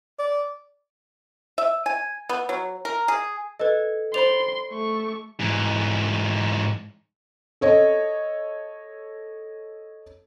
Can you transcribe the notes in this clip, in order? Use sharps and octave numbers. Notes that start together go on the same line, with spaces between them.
D5
E5
G#5
B3
F#3
A#4
G#4
A4 B4 D#5 G#6
C5 D5 B5 C6 F7
A3 C#6
G#2 E3
A4 C#5 D#5